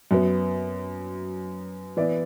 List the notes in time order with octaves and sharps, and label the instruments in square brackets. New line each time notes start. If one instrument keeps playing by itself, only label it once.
[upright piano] F#2 F#3 B3
E3 B3 E4 D5